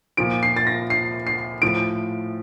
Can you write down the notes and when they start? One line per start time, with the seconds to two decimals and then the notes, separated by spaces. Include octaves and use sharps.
0.17 A#2 F3 D7
0.43 C7
0.57 A6
0.67 A#6
0.90 C7
1.27 C7
1.62 A2 F3 D7